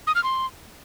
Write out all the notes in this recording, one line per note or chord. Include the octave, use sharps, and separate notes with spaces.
D#6
F6
C6